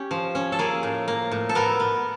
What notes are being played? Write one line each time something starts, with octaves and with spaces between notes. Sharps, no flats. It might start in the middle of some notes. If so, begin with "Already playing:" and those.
Already playing: C#4 G4
F3
C#4
A4
A#3 G#4
A2
A#3
A2
A4
B3 A#4
B3